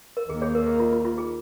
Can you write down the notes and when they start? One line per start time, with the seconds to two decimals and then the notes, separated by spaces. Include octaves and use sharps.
0.17 A#4
0.29 D#2 D#3 A#3 G#4
0.42 G#4 C#5
0.55 A#4
0.67 G#4
0.80 F4
0.93 F4
1.05 F4
1.18 G#4